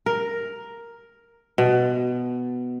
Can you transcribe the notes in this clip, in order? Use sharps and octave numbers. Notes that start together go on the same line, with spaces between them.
A#4
B2